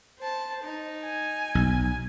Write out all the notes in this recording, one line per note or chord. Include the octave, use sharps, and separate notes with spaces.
C5 A5
D#4
G#5
B1